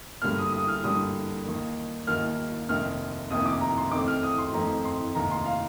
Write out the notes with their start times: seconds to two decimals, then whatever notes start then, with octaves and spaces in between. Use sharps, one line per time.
0.22 G2 D3 G3 A#3 F6
0.38 D#6
0.52 D#6
0.68 F6
0.84 G2 D3 G3 A#3 D#6
1.46 D#2 D#3 A#3
2.07 D#2 D#3 A#3 F6
2.69 F1 F2 D#3 A#3 F6
3.30 F1 F2 D#3 A#3 D#6
3.46 D6
3.61 A#5
3.77 C6
3.92 F2 D#3 A3 C4 D6
4.08 F6
4.23 D#6
4.38 C6
4.53 F2 D#3 A3 C4 A#5
4.85 C6
5.15 F1 D#2 D#3 A#5
5.31 C6
5.46 F5